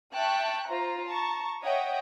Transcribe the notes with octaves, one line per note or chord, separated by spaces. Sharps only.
E5 G5 A5 C#6 F#6
F4 C5 A#5
A5 A#5 C#6
C#5 D#5 E5 F#5 G5